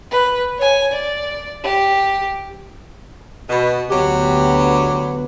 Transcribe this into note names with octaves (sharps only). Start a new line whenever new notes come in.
B4
C#5 G#5
D5
G4
B2
D2 F#3 B3 G4